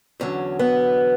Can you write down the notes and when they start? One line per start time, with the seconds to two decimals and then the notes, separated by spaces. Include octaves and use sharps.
0.20 E2 D3 F#3 C#4
0.59 B3